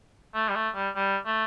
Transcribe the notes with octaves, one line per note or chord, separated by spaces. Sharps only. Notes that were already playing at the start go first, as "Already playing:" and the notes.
A3
G3
A3
G3
G3
A3